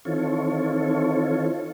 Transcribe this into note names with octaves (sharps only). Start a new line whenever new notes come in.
D#3 E3 C4 F4 A4 C#5